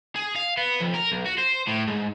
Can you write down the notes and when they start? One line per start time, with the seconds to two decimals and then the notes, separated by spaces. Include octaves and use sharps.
0.16 G#4
0.36 F5
0.58 B3
0.81 F2
0.94 A#4
1.12 B1
1.26 F#4
1.38 C5
1.67 A2
1.87 G#2